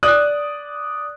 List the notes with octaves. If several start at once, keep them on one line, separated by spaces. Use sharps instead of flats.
D5 D#6 F#6